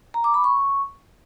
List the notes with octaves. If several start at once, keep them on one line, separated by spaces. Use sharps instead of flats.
A#5
D6
B5
C#6